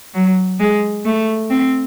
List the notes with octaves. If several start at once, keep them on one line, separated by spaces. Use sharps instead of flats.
F#3
G#3
A3
C4